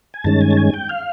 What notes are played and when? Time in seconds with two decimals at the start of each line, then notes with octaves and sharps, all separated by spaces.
0.14 G#5
0.24 G2 D#3 G#3 C#4 A5
0.41 G#5
0.51 A5
0.57 G#5
0.74 G5
0.89 F5